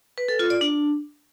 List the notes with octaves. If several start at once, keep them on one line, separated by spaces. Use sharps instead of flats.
B4
A4
F4
D5
D4